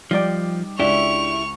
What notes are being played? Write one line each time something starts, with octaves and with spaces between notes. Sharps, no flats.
F3 G3 D#4 D5 G5 D6
C#2 D4 E4 G4 E5 C#6 F7